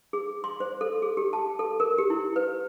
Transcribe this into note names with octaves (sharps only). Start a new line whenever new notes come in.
G#4
C6
C5
A4
G#4
G4
A5
A4
A#4
G4
E4
B4